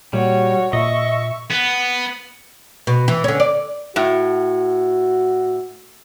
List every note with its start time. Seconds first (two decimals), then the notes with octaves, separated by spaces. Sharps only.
0.13 A#2 G3 F#4 C#5
0.73 A#2 D#5 E5 C#6
1.50 B3
2.87 B2
3.08 E3
3.24 D3 C#4
3.40 D5
3.96 A2 F#4